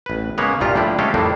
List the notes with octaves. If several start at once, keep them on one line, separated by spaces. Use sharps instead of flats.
A1 B4
C#3 G#3 A#3 B3 C#5 F#5
C2 G2 A#2 F4 G4 A#5
A2 F3 G3 D4 E4
G#3 A3 C#4 G4 A4 F5
F2 A2 G3 A#3 C4 D4